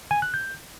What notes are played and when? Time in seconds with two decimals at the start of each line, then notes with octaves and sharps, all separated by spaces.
0.11 G#5
0.22 F#6
0.34 G6